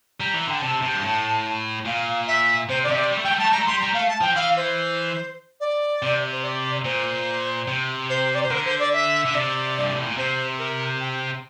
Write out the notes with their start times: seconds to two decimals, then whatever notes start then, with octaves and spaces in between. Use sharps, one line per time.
0.20 G3 A#5
0.34 E3
0.48 D3 G5
0.61 C3 A5
0.82 C3
0.94 G2
1.03 A2
1.86 A#2 F5
2.27 E5
2.69 C3 C5
2.83 D3 D5
2.90 C3 E5
2.97 D5
3.11 G3
3.18 A3
3.24 G3 G5
3.32 A3
3.38 G3 A5
3.46 A3
3.52 G3 A#5
3.60 A3
3.66 G3 C6
3.80 G3 A#5
3.93 A3 F5
4.08 A5
4.21 F3 G5
4.35 E3 F5
4.57 C5
5.60 D5
6.02 C3
6.32 C5
6.43 D5
6.84 A#2 C5
7.68 C3
8.10 C5
8.35 D5
8.43 C5
8.51 D3 A#4
8.65 C5
8.79 D5
8.93 E5
9.25 D3 E5
9.34 C3 D5
9.79 G2
9.92 A2
10.05 A#2
10.17 C3 C5
10.59 A#4
11.00 G5